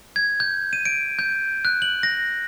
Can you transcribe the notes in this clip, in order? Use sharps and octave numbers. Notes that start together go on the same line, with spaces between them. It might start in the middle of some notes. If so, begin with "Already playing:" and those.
G#6
G6
D#7
D7
G6
F#6
F#7
A#6